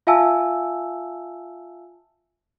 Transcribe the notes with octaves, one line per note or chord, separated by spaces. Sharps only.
F4 E5 F5 G#5 A5 E6